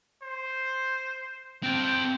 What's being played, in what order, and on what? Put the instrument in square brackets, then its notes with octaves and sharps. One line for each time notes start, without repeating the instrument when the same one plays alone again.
[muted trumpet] C5
[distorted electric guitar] C4 A5 [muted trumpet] G5